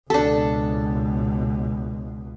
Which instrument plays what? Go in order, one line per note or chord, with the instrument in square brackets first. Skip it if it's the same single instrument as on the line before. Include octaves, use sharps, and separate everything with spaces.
[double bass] C#2 B2 [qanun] D4 A4